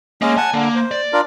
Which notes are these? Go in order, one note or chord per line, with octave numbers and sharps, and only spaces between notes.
G#3 A#3 C#4 D#5
F#5 G#5 A5
D3 A#3
C5
D5
D4 F4 A#4